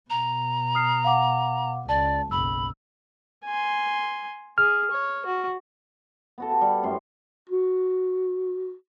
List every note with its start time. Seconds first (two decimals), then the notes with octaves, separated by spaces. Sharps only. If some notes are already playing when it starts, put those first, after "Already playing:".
0.10 B2 A#5
0.75 D#6 F6 C7
1.04 F5 F#5 D6
1.89 C#2 D5 A5
2.31 F#1 B1 B5 E6
3.45 G#5 C6
4.58 G#4 F6
4.91 C#5
5.26 F#4
6.38 B3 F#4 A4
6.50 G4 A4
6.61 G3
6.83 F#2 A2 C6
7.49 F#4